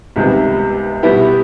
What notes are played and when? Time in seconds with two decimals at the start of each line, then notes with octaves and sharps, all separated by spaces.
0.16 C#2 C3 D#3 G3 B3
1.03 B2 G3 B3 E4 G4